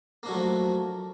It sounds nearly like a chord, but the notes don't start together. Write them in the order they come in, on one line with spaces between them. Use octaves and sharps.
A#3 D4 F#3 A3 F3